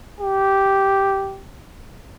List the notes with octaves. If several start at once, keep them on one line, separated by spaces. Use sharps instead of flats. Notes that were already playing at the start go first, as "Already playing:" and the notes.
G4